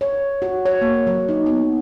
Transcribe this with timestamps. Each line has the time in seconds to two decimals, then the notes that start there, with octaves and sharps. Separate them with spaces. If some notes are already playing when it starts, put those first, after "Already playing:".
0.01 C#5
0.42 F#4
0.65 C#5
0.81 A#3
1.07 F#3
1.29 D#4
1.46 B3